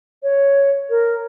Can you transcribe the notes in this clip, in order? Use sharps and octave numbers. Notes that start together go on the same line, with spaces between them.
C#5
A#4